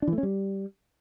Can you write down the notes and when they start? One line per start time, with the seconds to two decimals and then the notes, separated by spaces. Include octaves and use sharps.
0.02 D4
0.08 E3
0.13 A3
0.18 C#4
0.23 G3